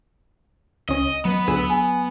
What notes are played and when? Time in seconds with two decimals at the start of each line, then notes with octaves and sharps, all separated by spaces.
0.89 C#2 C#4 D#5
1.25 F#3 B3 B4
1.48 D2 G#4 E6
1.70 G#5